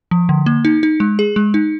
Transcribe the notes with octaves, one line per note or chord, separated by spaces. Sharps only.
F3
D3
A#3
D#4
D#4
G#3
G#4
G#3
D#4